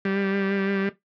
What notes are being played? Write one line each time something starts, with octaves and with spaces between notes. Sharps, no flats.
G3